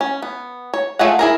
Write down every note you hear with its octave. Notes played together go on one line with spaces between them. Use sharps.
C#4
B3
C#5
A3 F4 G#4 C#5 F#5
E4 G#4 A#4